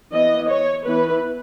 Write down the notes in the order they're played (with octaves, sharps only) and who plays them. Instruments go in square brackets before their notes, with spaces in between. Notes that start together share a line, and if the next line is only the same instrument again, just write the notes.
[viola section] E3 B3 D#5
C#5
E3 B3 B4